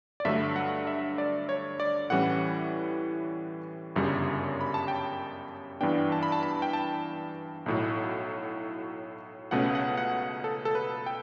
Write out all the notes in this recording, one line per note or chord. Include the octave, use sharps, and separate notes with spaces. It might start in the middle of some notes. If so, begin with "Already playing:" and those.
D5
G2 D3 F#3 A3 E5
F#5
E5
D5
C#5
D5
A2 E3 G3 C#4 F#5
G1 F#2 C#3 G3
B5
A5
G5
G2 E3 B3 D4 G5
A5
B5
A5
B5
G5
A5
B1 A2 F#3
C#2 B2 A3 C#4 F#5
F#5
F#5
A4
A4
B4
G5